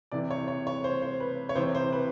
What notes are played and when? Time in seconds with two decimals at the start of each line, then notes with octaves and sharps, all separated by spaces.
0.12 C3 E3 D5
0.31 C#5
0.48 C#5
0.67 C#5
0.84 C5
1.02 C5
1.20 B4
1.49 C#5
1.55 C3 E3 C5
1.75 C5
1.93 B4